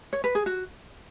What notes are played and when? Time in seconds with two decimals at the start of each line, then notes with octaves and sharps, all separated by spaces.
0.13 C#5
0.24 B4
0.35 G#4
0.46 F#4